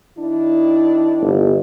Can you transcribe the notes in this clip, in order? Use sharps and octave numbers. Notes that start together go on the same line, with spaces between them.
D#3 D4 E4
G1